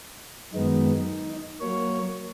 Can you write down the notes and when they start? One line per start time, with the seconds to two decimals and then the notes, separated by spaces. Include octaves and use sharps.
0.53 F#2 D#3 G#3 B3 D#4
1.61 F#3 A#3 C#5